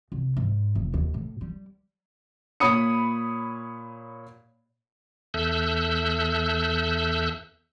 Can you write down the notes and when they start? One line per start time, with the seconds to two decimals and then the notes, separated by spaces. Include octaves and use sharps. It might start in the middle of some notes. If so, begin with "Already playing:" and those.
0.12 C2
0.37 G#2
0.75 F1
0.94 D#2
1.14 A2
1.41 G3
2.60 A#2 C#5 B5 D#6 C#7
5.34 E2 A4 E5 E6 F#6 G6